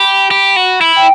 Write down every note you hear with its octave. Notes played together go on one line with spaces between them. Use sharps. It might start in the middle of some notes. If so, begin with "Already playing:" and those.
Already playing: G4 B5
G4
F#4
E4
G5